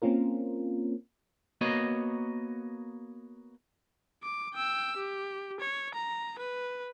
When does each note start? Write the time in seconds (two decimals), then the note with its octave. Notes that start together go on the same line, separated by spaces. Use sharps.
0.02 A#3 C4 C#4 F4 A#4
1.61 A#3 B3 F#4 C#5 D#5
4.23 D6
4.54 G5 E6
4.97 G4
5.60 C#5
5.95 A#5
6.39 B4